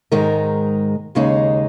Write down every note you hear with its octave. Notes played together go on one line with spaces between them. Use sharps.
G#2 D#3 G#3 D#4 A#4
D#2 C#3 G#3 D#4